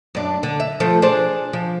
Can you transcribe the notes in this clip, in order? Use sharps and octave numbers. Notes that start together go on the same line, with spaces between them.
F#2 D4
D3
E5
F3 A3
D4 G#4 C5
F3